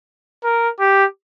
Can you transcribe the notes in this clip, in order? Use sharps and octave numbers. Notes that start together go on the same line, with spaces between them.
A#4
G4